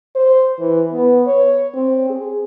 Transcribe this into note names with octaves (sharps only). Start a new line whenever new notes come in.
C5
E3
B3
C#5
C4
G#4